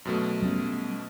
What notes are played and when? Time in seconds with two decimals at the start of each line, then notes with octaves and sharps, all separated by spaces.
0.05 F#2 B2 A3
0.42 G3 B3 C#4